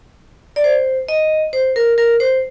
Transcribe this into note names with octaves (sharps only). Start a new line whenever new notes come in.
D5
C5
D#5
C5
A#4
A#4
C5